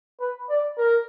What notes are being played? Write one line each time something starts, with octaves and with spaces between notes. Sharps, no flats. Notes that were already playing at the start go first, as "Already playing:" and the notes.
B4
D5
A#4